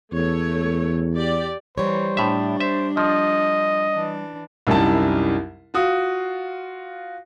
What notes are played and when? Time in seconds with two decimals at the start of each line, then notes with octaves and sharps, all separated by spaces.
0.12 E2 A3 C#5
1.13 G4 D5
1.78 E3 G3 C5 C#5
2.17 A2 D4 E5
2.60 C5 E5
2.97 F3 D#5
3.95 E3 D4
4.67 C2 F#2 G3 D#4 E4 A5
5.74 F4 F#4 D#6